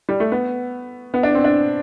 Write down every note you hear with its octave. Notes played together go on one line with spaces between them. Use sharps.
G3
A3
B3
B3
D4
C4
D4